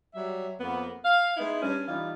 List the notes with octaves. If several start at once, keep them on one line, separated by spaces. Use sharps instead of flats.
F#3 G3 E5
F2 A#3 B3
F5
G#3 B3 D#4 E4
G2 C#4
E3 G3 D#4 F4